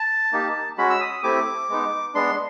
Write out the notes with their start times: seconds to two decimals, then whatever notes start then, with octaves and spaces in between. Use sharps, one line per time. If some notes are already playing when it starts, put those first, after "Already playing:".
Already playing: A5
0.32 A#3 D#4 G4
0.78 G#3 C#4 F#4 B5
0.90 E6
1.01 D#6
1.23 A3 C4 E4 G4 D6
1.69 G#3 B3 D#4
2.14 G#3 B3 D4 C6